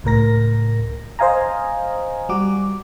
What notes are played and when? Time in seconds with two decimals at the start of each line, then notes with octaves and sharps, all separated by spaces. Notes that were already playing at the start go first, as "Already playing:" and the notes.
0.04 C#2 A2 A#4 A#6
1.19 C5 D#5 F5 G#5 A#5
2.29 G3 F#4 D6